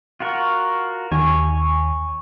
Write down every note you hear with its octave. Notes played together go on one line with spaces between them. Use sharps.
F4 F#4 A#4
D#2 C#5 G#5